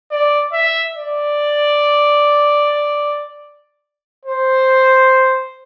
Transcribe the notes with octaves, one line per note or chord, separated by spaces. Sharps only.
D5
E5
D5
C5